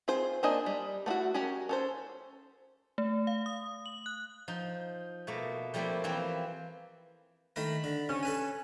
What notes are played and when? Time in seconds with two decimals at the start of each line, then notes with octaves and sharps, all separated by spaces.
0.08 C4 F4 G#4 C5
0.43 A#3 D4 C5 D#5 G#5
0.66 G3
1.06 A3 B3 E4 F#4
1.34 C#4 F#4 G4 A#4
1.69 C#4 A4 C5
2.98 A3
3.27 F5
3.46 D#6
3.86 F#7
4.06 F#6
4.48 F3 D#4
5.27 B2 A3 A#3
5.74 F3 G3 A3 A#3 C4 E4
6.04 E3 F3 A#3 C4 E4
7.56 D#3 A3 A#4 B5
7.84 D3
8.09 C3 C#4
8.23 A4 B4 G#5